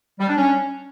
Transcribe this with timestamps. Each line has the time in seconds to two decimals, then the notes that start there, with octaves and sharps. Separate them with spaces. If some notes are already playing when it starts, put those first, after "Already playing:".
0.20 G3
0.29 D4
0.37 C#4